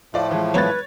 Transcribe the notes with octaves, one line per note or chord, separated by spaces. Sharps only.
A2 F3 A3 F4 D5
E3 G#3
E2 G#2 F#3 B4 C#5 G#6 A6